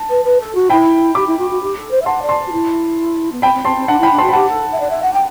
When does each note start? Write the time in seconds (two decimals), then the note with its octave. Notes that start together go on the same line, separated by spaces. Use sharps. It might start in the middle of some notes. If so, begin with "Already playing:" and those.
Already playing: A5
0.09 B4
0.24 B4
0.40 A4
0.54 F#4
0.70 E4 G5 B5
1.15 G4 B5 D6
1.27 E4
1.38 F#4
1.50 F#4
1.61 G4
1.76 A4
1.91 C5
2.01 E5
2.06 F#5 A5 C6
2.22 D5
2.29 A5 C6
2.47 F#4
2.52 E4
3.31 B3
3.42 C4 G5 B5
3.53 C4
3.65 C4 A5 C6
3.76 C4
3.88 D4 F#5 A5
3.99 E4 G5 B5
4.11 D4
4.18 A5 C6
4.22 F#4
4.29 B5
4.33 G4 F#5 A5
4.49 A4
4.71 E5
4.79 D5
4.90 E5
5.02 F#5
5.13 G5